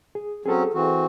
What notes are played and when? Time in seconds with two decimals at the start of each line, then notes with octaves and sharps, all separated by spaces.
0.15 G#4
0.46 F#3 C4 C#4 G#4 A4
0.74 E3 C4 F#4